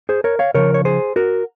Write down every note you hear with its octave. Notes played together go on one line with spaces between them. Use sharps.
G#4 C5
A#4 C#5
C#5 F5
C#3 F3 A#4 C#5
C#5
G#4 C5
F#4 A#4